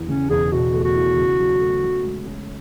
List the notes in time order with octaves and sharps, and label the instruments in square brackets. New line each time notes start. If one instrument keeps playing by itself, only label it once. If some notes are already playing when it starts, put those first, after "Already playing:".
Already playing: [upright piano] E2
[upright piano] C#3 [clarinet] C#4
[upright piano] E1 [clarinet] G#4
[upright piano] B2 [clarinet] F#4
[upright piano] A3
[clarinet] F#4
[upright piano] E4
C#3
F#3
A3
C#3
G#3
C#4